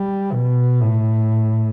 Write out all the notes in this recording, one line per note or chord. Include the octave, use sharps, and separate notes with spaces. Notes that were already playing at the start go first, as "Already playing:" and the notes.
Already playing: G3
B2
A2